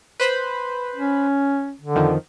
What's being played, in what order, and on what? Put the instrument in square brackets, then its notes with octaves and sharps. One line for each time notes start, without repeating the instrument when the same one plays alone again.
[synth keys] B4 C5 B5
[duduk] C#4
D3
[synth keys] F2 D#3 F3